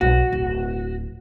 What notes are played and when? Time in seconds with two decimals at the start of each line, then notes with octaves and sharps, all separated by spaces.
0.01 B1 F#4
0.32 D1